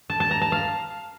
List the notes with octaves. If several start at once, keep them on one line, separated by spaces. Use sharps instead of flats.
A5
A5
A#5
A5
F5